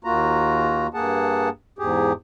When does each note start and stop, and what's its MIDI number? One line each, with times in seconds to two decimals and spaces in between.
0.04 0.87 39
0.04 0.87 58
0.04 0.87 65
0.04 0.87 66
0.04 0.87 82
0.94 1.49 43
0.94 1.49 58
0.94 1.49 68
0.94 1.49 78
0.94 1.49 81
1.79 2.12 40
1.79 2.12 44
1.79 2.12 67
1.79 2.12 68